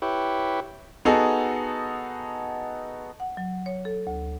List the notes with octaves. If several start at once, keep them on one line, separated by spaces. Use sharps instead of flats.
E4 G4 B4 C#5
B3 D#4 F#4 G#4 A4
F#5
F#3
C#5
A4
D2